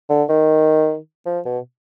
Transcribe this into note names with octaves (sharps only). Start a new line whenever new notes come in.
D3
D#3
F3
B2